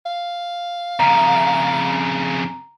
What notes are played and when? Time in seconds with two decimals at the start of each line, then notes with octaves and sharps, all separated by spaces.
0.06 F5
1.00 F2 C#3 A#5